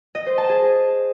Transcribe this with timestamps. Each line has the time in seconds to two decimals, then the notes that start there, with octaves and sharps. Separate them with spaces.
0.15 D#5
0.26 C5
0.38 A5
0.49 G#4